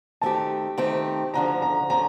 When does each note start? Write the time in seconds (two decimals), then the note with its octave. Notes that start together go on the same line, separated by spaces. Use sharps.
0.21 D#3 A3 C4 G4 A5
0.78 D#3 A3 C4 G4
1.34 D2 D3 F3 A#5
1.62 A#5
1.90 D3 F3 A#5